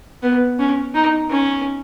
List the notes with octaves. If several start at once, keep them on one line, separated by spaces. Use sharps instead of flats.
B3
C#4
D#4
C#4